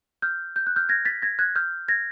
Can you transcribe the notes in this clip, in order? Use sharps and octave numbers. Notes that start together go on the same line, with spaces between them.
F6 G6
G6
F#6
F6 G6
G#6 A#6
A6 B6
G#6 A#6
F#6 G#6
F6 G6
G#6 A#6